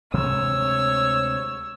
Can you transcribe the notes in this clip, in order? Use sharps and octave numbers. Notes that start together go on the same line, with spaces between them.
D2 C3 G#3 C#5 E6